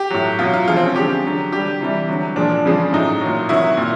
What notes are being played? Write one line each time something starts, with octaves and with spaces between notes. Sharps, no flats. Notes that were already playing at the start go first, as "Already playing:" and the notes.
Already playing: G4
A2 F#3
B2 F#3 F4
F4
C3 F3 G#3 F4
C4
C#4
D3 F3 G#3 G4
D3 F#3
D3 G3 G4
C3 E3 G3
D3 F#3
A#2 F3 G#3 D4
C#3 F3 G#3
A2 F#3 D#4
F#3
A#2
C3 D#3 F#3 E4
A#2